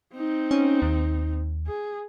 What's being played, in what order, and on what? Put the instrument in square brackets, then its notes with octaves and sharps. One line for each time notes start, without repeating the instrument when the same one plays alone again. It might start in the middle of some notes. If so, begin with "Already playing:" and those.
[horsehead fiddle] C4 D#4
[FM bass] C#4
D#2
[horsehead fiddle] G#4